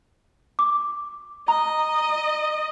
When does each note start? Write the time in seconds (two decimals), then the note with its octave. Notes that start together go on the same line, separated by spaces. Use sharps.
0.59 D6
1.48 D#5 A#5